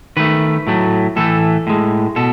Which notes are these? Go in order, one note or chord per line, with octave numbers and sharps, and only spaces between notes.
D#3 A3 B4
A2 F#3 A3
A2 E3 A3 A4
A2 G#3
B2 A4